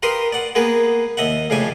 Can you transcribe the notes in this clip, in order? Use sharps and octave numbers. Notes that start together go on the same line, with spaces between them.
G4 A#4 B4 F5 C6 D#6
D5 F#5
A#3 B3 G#4 A#4 B4
D#2 D#5 E5 F#5
F2 A2 C#3 D4 G4 G#5